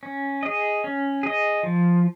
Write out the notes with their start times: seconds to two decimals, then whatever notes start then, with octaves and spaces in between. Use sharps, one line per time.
0.03 C#4
0.43 G#4 D#5
0.84 C#4
1.23 G#4 D#5
1.63 F3